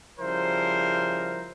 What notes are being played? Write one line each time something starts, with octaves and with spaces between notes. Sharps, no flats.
C#3 F3 G3 E4 A#4 C5